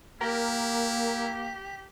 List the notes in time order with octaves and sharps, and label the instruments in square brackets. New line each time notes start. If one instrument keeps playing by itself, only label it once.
[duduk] A#3 [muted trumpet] E4 [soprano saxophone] G4 [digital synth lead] A#4